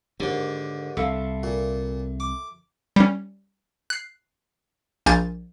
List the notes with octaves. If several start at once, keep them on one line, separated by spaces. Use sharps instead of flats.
D#2 G#2 D3
C2 A4 E5 F5
A#2
D6
G3 C#4
F#6 C7
A#1 A#3 G#5 G6 A6